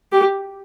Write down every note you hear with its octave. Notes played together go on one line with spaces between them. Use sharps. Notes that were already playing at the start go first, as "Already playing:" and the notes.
G4